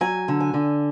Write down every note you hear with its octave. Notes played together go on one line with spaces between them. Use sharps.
F#3 G#5
D3
G#5
D3